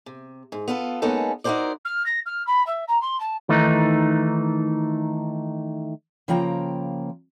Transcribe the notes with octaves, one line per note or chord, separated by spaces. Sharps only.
C3
G#2
B3 F4 A4
G#3 A#3 B3 C#4 D#4 A4
D#4 E4 F#4 A#4 C5 D5
F6
A#6
F6
B5
E5
A#5
C6
A5
D#3 E3 A3 D#4
C#3 F3 A#3 G5 A#5